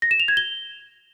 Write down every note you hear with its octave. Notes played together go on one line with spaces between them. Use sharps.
A#6
E7
F7
G#6
G7